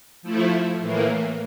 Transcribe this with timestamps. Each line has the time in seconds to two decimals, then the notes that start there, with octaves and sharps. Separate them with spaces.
0.22 F3 A3 E4
0.79 A2 E3 A#3